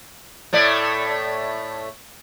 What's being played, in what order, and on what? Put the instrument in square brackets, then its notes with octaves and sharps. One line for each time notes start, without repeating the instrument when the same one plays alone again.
[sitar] A2 A3 D5